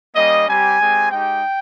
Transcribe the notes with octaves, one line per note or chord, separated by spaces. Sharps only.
G3 A#3 C#4 D#5
G3 C4 G4 G#5
G#3 C4 G4
G#3 D#4 G4 G5